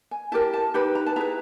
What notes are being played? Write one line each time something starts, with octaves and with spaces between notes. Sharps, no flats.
G#5
E4 G4 A#4 A5
A5
D#4 G4 B4 B5
A#5
A5
E4 G#4 B4 A#5